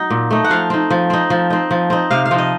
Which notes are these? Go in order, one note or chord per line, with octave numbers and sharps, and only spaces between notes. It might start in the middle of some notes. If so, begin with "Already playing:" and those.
Already playing: F#3 D#4
A#2
A3 D#4
F#5
F3 F5
C4 D#4
F3
C4 D#4
F3
C4 D#4
F3
C4 D#4
C3 F5
F5
F3 C4 D#4
D#5